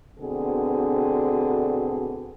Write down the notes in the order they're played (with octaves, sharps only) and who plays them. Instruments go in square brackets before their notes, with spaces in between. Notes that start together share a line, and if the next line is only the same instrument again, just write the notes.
[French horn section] D2 B2 D3 B3 C4 G#4